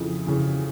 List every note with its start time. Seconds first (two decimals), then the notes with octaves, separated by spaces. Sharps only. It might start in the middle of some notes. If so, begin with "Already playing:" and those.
Already playing: F2 C#3 E3
0.27 C#3 E3